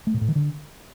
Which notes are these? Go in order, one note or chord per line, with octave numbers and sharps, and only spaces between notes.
A3
A#2
A2
D#3
D3